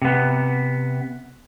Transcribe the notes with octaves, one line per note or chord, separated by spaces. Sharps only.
C3 B3